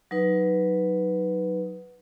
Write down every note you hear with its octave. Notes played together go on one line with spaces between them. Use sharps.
F#3 D#4 B4